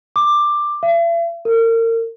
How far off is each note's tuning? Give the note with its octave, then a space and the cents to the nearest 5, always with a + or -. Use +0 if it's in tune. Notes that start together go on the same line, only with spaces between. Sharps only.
D6 +10
E5 +45
A#4 -35